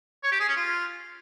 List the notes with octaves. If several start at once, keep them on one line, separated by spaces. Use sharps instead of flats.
C#5
G4
G#4
C#4
F4